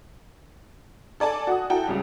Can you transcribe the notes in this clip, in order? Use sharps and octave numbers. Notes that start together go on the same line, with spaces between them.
A4 D5 G#5 A5
F#4 F#5 D#6
E4 F#4 A4 G5
C#2 C#3 G3